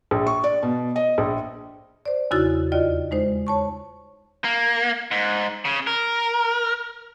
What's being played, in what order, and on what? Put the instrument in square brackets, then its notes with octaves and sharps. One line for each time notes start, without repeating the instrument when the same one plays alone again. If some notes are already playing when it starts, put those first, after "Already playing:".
[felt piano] A#1
C#6
D5
B2
D#5
A#1
[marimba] C5 D5
E2 C#3 D#4 E4 F#4 A6
D#2 F4 D5 D#5
G#3 D#4 C5
C#5 A5 C#6
[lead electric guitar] A#3
G#2
C#3
A#4